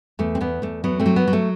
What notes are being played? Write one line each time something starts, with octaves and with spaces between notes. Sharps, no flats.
E2 A3
C4
E2 B3
E2 A3
F#3 B3
A3 C4
F#3
B3
F#3
A3